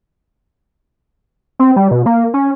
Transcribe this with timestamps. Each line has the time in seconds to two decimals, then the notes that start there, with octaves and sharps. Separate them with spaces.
1.59 C4
1.76 G3
1.91 B2
2.06 A#3
2.34 C#4